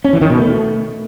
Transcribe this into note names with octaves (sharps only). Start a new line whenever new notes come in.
C#4
E3
D#3
B2
A3